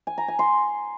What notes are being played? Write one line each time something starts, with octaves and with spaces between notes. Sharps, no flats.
G#5
A#5
G#5
C6